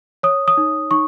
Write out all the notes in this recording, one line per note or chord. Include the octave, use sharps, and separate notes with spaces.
C#5 D#6
D#6
D#4
D#4 C#6